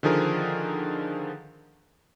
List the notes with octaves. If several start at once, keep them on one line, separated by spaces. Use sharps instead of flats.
D3 D#3 F3 G#4 A#4